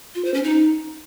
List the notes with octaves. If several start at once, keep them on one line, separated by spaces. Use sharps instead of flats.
F4
C5
C#4
D#4